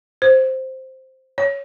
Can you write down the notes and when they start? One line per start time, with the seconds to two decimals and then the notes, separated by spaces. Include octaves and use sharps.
0.22 C5
1.38 C#5